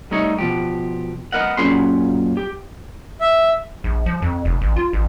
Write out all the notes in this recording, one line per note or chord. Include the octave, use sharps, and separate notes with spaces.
G3 A3 D#4 C#5
B2 F3 G4
B3 A#4 D#5 F#5
F#2 A#2 C#4 G#4 B5 C6
G4
E5
A#1
F3
F2
F1
A1
F4
A1